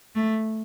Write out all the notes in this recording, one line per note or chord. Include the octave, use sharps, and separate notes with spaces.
A3